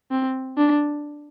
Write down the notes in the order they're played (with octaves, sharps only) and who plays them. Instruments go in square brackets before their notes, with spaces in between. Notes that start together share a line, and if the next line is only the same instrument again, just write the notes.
[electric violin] C4
D4